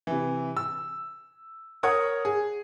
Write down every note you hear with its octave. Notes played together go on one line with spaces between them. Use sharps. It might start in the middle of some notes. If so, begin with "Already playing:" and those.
C3 E3
E6
A#4 C#5 F#5 D#6 G#6
G#4